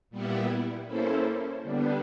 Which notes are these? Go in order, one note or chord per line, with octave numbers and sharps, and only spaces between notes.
A#2 G3 B3 E4
A#3 C#4 E4 A4 C5
D3 G3 B3 D4